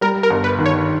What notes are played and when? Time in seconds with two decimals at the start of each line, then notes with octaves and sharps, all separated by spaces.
0.01 G3 A#4
0.23 A#4
0.30 G1
0.44 B4
0.59 D#3
0.66 C#5